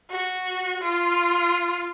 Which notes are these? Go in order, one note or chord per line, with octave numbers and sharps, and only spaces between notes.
F#4
F4